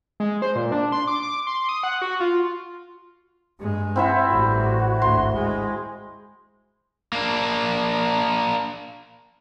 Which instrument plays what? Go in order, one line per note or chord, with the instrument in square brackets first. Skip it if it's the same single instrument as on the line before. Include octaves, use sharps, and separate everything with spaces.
[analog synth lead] G#3
C5
A#2
D4
C6
D6
D6
C6
D#6
F#5
F#4
F4
[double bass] G2 G#3
[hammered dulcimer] C4 E4 E5 [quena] F#5
[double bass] A1 G3 [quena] F#4
[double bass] G#1 D2 [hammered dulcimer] C6
[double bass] G#3
[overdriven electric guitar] A#3 D4